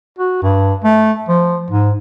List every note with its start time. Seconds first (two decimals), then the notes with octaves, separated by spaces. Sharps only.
0.18 F#4
0.43 G2
0.84 A3
1.28 F3
1.70 G#2